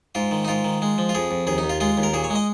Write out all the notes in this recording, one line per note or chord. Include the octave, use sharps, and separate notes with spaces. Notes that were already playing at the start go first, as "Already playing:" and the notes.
G#2 F4
D#3
D#4
G#2 F4
D#3
G#3
F3
F4
F2 G#4
F2
D#2 G#4
D#4
D#2
F4
G#3 F4
D#2
A#4
A#2 G#4
C#5
G#3
D#5